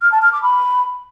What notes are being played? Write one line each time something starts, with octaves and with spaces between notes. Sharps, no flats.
F6
A5
F6
D6
B5